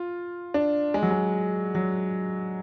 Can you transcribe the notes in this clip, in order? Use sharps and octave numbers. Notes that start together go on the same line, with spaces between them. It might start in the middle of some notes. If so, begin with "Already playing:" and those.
Already playing: F4
D4
G#3
F#3
G#3
F#3